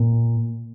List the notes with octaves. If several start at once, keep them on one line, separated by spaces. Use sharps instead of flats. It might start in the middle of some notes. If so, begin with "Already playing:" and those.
Already playing: A#2